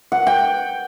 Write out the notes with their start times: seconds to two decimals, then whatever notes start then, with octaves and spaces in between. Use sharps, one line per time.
0.12 F#5
0.27 G5